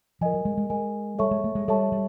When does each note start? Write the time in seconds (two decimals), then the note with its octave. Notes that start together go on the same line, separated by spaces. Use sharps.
0.21 F3 A#4 D#5 G#5
0.34 F#3
0.45 G#3
0.57 G#3
0.70 G#3 A#4 D#5 G#5
1.19 G3 A4 C#5 E5 A5 C#6
1.31 G#3
1.44 A3
1.55 G#3
1.68 G3 A4 C#5 E5 A5 C#6
1.92 G3